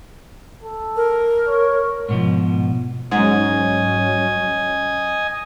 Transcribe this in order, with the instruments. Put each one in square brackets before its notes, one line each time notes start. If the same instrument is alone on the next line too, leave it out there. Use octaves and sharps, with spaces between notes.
[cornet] A4
[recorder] A#4
[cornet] C#5
[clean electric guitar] G#2 B2 F3
[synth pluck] G#2 [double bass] F#3 C#4 [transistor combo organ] D#5 G#5